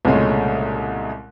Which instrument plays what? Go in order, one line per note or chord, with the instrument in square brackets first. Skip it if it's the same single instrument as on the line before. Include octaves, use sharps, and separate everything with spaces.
[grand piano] C2 A#2 C#3 G#3 A3